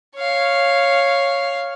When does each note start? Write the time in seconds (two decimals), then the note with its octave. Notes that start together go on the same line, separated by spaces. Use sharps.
0.16 C#5 F5